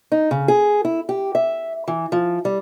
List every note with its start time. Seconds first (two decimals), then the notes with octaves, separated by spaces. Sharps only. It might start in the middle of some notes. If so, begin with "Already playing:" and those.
0.12 D#4
0.31 C#3
0.48 G#4
0.85 E4
1.09 G4
1.35 E5
1.88 E3
2.12 F3
2.45 G3